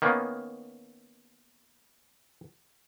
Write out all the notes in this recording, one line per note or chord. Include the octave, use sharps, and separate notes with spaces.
D#3 A#3 B3 C#4